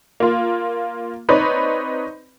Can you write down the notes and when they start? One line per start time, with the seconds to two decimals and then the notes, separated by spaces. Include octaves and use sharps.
0.20 A#3 F4
1.29 C4 D#4 B4 C#5 D5 B5